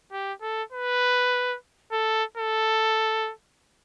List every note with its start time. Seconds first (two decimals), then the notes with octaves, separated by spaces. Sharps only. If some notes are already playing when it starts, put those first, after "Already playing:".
0.12 G4
0.42 A4
0.72 B4
1.92 A4
2.37 A4